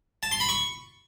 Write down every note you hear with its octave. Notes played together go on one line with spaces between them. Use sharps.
A5
C6
B5
C#6